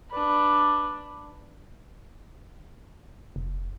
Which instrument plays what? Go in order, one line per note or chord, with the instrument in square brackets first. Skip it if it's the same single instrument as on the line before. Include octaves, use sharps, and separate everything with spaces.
[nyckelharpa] D4 B4
[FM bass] F1